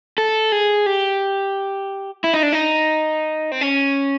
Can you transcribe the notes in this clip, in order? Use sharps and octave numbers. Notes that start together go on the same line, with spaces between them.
A4
G#4
G4
E4
D#4
D4
D#4
C4
C#4